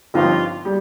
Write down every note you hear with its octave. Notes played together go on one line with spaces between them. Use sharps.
G1 G2 F3 C4 D#4 F4
G3